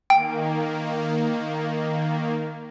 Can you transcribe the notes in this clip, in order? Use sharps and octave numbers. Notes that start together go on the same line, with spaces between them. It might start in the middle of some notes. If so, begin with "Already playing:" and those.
D#3 A#3 G5